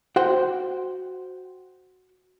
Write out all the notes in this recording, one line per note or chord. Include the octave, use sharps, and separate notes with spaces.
F#4 C5 F#5 G5